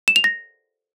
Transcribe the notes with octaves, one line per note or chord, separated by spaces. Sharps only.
E7
F7
A#6